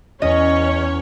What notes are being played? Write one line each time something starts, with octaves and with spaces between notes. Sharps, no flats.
E2 C#4 C#5 D#5